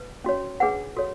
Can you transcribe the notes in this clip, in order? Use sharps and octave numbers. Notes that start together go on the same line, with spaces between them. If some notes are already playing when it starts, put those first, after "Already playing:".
Already playing: B4
C#4 F#4 C#5
D4 G#4 B4 F#5
F#4 A4 C#5